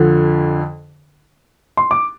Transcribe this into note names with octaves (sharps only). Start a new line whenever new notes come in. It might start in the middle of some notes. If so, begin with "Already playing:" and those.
Already playing: F2 D3 F3
C6
D6